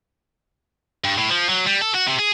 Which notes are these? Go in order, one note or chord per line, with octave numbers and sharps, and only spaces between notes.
G2
A2
F3
F#3
G3
A4
F#4
C3
G#4